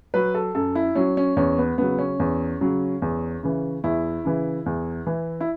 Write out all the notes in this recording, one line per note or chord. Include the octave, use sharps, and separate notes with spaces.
F#3 B4
A4
F#2 A4
E4
F#3 C#4
C#4
E2 C#4
B3
C#3 F#3 B3
C#4
E2
C#3 F#3
E2
C#3 E3
E2 E4
C#3 E3
E2
E3
E4